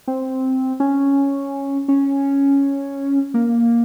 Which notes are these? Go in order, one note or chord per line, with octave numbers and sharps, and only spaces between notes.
C4
C#4
C#4
A#3